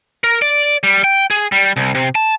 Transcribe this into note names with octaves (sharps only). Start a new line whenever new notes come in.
A#4
D5
G3
G5
G#4
G3
C2
C3
A5